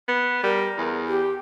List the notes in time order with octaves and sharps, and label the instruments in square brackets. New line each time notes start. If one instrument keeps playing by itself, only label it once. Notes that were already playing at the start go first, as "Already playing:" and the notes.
[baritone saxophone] B3
[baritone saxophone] G3 [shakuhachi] A#4
[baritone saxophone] E2
[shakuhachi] G4